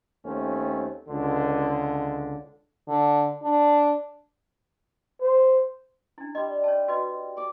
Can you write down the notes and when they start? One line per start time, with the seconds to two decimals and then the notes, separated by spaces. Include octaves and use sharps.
0.25 D#2 A3 C4 C#4
1.08 C#2 D3
2.88 D3
3.43 D4
5.21 C5
6.18 D4 E4
6.35 G3 D#5 C6
6.64 C#5 A5
6.88 F#4 B4 D#5
7.37 D5 D6